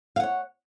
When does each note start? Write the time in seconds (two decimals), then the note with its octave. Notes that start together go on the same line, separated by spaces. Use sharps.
0.16 F5
0.20 F#5
0.23 C#5